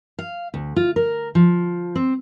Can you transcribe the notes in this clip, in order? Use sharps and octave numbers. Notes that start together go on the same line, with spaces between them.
F5
D2
F4
A#4
F3
C4